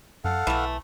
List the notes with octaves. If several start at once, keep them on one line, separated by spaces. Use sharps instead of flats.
F#2 A4 F5 F#5
B1 E3 A3